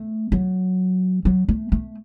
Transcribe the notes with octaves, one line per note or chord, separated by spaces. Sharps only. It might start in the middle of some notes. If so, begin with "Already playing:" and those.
Already playing: A3
F#3
F#3
A3
A3